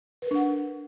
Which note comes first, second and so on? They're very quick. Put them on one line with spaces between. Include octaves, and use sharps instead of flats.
B4 A#4 D4 F#5